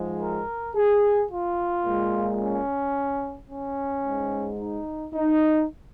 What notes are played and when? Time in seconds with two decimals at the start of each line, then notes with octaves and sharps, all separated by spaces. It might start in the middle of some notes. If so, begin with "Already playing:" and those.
Already playing: G#2 F3 G#3
0.20 A#4
0.75 G#4
1.30 F4
1.85 A#2 G#3
2.39 C#4
3.49 C#4
4.04 G#2 G#3
4.59 D#4
5.14 D#4